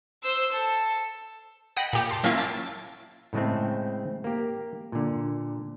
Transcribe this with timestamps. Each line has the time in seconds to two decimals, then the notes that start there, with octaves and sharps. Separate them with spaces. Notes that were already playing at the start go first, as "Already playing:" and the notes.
0.22 C5 E6
0.52 A4
1.77 D#5 F#5 G5 B5
1.93 A#2 G4 C#7
2.09 A5 C6 D6
2.24 F#3 A#3 C#4 E4 F4
2.38 A5 D6 E6
3.33 A2 C#3 G#3 A3 C4
4.24 A#3 G4
4.92 A#2 D3